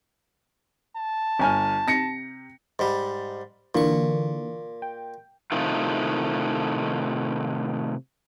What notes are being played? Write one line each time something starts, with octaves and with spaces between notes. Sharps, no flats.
A5
G1 G#5 F6
C3 A#6 C#7
G#2 G3
A#2 D3 E3 A#3 C#6
G5
A2 C3 D#3 A3 D#4 F4